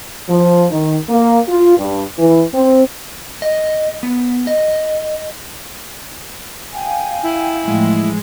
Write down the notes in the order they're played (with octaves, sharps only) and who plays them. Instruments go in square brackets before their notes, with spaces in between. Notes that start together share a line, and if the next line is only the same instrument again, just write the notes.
[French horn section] F3
D#3
A#3
F4
G2
E3
C4
[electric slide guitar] D#5
B3
D#5
[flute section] F5 G5 G#5
[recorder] E4
[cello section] A2 E3 F3 [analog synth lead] G#3